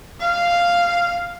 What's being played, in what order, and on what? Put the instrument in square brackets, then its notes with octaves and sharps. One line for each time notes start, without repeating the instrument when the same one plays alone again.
[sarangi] F5